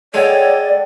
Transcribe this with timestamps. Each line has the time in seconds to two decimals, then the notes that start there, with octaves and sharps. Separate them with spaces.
0.14 G#3 A4 C#5 D5 F#5 G5